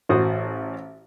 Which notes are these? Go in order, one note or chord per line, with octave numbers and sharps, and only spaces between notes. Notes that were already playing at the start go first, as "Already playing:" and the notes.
A1 F#4 C5 D#6